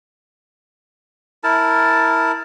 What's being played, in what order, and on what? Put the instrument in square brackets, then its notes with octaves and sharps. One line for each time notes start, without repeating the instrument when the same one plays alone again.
[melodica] E4 A#4 A5